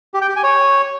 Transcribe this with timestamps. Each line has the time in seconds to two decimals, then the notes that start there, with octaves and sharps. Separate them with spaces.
0.14 G4
0.21 G5
0.29 G4
0.36 G#5
0.44 C#5